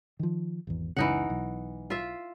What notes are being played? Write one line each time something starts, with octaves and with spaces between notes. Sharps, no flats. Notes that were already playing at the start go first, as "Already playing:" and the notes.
D#3 F3
G#1 E2
F#1 C#2 C#3 E3 D#4 F#5
B1
F4 E5